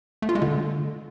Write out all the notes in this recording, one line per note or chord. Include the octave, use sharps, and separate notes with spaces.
A3
F4
G#3
D3